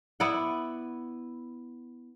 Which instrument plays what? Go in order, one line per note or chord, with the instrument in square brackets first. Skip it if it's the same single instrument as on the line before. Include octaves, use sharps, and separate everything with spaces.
[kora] B3 E4 D5 F#5